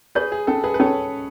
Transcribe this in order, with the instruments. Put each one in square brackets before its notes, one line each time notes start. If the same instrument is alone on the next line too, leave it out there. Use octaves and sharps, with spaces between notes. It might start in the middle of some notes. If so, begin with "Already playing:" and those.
[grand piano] G#4 B4 [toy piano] C#5
[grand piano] G#4
[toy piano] C#4 [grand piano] A4
[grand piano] G#4 B4
B4
[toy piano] C#4 [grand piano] A4 C#5